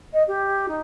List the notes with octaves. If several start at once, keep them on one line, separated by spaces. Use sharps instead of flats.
D#5
G4
D#4